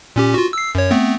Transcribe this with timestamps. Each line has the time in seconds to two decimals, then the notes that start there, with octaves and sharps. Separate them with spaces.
0.16 A#2 C#4 G4
0.34 F4 F#4
0.53 E6 C7
0.75 F#2 C#5
0.91 A3 B3 C4